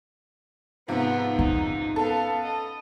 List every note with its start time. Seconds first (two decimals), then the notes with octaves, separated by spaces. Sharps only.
0.88 G#2 C3 F3 B3 F4
1.39 C#4 D#4
1.96 B3 A4 F5
2.43 D#5